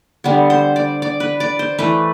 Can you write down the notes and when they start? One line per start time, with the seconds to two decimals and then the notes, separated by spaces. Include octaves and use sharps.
0.24 D3 G3 B3
0.50 C5
0.76 D5
1.02 D5
1.20 B4
1.40 D5
1.59 C5
1.78 E3 A3 B4